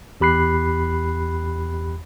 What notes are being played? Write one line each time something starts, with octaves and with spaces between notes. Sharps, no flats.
E2 G4 B5 F#6 C7